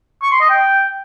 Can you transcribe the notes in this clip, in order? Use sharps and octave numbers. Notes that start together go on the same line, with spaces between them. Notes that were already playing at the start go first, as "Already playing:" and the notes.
C#6
C6
D#5
G5